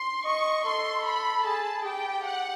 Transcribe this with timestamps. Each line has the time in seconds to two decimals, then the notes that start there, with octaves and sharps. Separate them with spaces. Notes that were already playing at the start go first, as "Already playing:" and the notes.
Already playing: C6
0.25 D#5 C#6
0.65 A4 C6
1.05 B5
1.45 G#4 A5
1.85 G4 G5
2.24 F#5